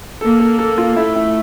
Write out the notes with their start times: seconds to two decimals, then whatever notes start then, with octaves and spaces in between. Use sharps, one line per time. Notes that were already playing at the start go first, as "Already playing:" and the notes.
0.21 A#3 A4
0.40 A4
0.59 A4
0.78 F4
0.96 A3 E4
1.16 E4